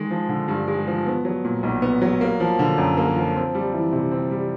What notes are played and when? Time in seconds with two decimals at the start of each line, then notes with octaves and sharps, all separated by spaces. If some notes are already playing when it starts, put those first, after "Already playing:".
Already playing: D#3 G#3
0.11 F3
0.29 D3
0.48 G2
0.68 G#3
0.87 F3
1.06 B3
1.25 F#3
1.44 A#2
1.63 B1
1.82 B3
2.02 F#3
2.21 A#3
2.40 F3
2.59 D3
2.78 F#2
2.97 A#3
3.16 F3
3.36 C4
3.55 G3
3.74 E3
3.93 C3
4.12 C4
4.31 G3